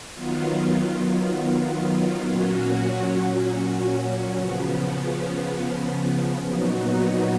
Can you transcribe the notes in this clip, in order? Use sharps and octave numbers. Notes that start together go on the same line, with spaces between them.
D#3 F#3 B3 F4
A#2 F#3 C#4 F#4
C#3 F3 B3
A#2 F#3 B3 D#4 F#4